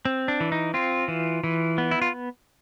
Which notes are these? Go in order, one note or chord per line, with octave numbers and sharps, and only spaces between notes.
C4
D4
E3
D#4
C4 F4
E3
E3
B3
E4
F4